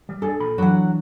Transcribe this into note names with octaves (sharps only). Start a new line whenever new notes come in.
G3
D4 G#4 A4 D5
A#2 F3 B5
E3 F#3 G#3 D4 F#5